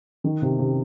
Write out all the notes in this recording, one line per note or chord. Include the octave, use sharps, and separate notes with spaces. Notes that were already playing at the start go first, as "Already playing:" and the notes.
D#3
C3
C3